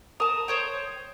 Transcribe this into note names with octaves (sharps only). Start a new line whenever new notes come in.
A#4 A5 D#6
C5 C#5 G5